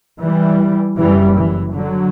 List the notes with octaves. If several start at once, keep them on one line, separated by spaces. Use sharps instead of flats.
E3 G3
F#1 F#2 E3 G3
E3
D3 F#3